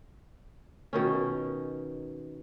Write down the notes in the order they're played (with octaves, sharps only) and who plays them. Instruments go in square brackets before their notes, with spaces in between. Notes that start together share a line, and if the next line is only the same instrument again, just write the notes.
[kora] B2 D#3 C#4